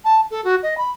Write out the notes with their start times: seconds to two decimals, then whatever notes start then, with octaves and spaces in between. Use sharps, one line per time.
0.05 A5
0.31 A4
0.44 F#4
0.63 D#5
0.78 B5